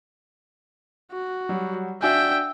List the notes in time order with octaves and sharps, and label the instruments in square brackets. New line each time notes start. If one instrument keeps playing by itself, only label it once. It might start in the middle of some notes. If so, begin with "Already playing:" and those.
[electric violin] F#4
[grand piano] F#3 G3
[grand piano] D4 F#4 G#5 [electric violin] E5 G5